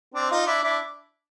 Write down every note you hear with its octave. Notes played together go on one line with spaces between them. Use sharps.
C4 D4
D#4 F4
D4 E4
D4 E4